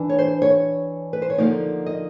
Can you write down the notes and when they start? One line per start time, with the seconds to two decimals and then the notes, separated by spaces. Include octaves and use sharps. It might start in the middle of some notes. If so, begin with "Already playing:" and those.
Already playing: E3 D4
0.09 C#5
0.19 C5
0.42 C#5
1.13 B4
1.22 C5
1.30 C#5
1.38 D3 F3 A#3 D#4 D5
1.86 D#5